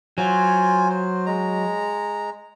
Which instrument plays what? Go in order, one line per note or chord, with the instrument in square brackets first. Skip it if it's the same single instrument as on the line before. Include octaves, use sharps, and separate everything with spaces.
[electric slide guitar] F#3 [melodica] F4 C5 G#5
[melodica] C5
G#3 A#5